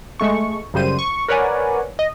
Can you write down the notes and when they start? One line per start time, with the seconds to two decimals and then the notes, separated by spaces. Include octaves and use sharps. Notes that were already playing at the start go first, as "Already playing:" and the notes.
0.20 G#3 A3 C#6
0.74 F#2 C#3 G3 C5 D#7
0.99 C#6
1.28 A#4 B4 C#5 D5 F#5 G#5
1.99 D#5